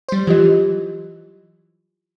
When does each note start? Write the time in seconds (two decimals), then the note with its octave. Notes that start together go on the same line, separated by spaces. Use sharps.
0.09 G3 C5
0.27 E3 F#3 F4 G4 D#5